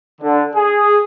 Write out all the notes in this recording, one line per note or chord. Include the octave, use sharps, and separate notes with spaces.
D3
G#4